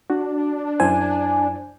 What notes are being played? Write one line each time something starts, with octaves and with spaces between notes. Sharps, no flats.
D4 F#4
F#2 E4 C5 G#5